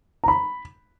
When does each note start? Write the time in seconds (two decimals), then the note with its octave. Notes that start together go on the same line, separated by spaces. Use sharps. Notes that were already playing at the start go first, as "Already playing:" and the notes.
0.24 A#5
0.28 B5